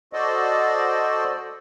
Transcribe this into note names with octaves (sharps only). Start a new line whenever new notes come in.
F#4 A4 C5 D5 D#5